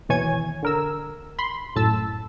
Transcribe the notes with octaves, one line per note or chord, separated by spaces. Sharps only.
D#2 B2 E3 C#5 G#5 G#6
D3 A#4 E6
B5 C6
F#2 A2 A5 E6